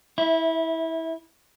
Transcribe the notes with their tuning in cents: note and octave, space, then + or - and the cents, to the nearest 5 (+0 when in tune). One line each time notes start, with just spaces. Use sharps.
E4 -20 E5 +0